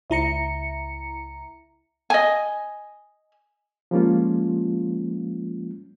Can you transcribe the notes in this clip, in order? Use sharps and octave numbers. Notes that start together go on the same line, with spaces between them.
C#2 E4 A#5 C#7
D#5 G#5
F3 G3 G#3 A#3 C#4 F4